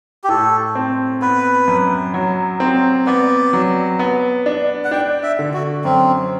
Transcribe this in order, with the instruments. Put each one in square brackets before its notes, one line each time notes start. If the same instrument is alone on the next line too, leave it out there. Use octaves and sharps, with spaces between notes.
[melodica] G4
[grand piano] A2 [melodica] A4
[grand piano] C4
[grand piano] B3 [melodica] B4
[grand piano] F#2
F#3
C4
[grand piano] B3 [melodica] D5
[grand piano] F#3
B3
D4
[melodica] F#5
[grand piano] D4 [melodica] G5
[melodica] E5
[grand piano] D3
[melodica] F#4
[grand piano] F#2 [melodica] C4